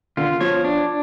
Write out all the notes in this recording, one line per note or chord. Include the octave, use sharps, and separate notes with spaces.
D3 F4
F3 C#5
D4